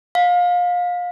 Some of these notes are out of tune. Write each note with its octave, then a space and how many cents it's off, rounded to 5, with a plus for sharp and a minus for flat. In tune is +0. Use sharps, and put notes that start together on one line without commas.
F5 +30